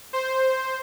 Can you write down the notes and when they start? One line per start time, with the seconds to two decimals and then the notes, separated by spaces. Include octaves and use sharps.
0.13 C5